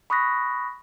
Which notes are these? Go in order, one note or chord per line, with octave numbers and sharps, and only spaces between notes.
B5 C#6 D#6 F#6 A#6 B6